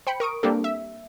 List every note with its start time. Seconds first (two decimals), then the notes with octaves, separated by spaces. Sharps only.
0.07 C5 G5 B5 C#7
0.20 A#4 C#6 D#6 D7
0.43 G3 A#3 C4 D4 G4 A4
0.64 E5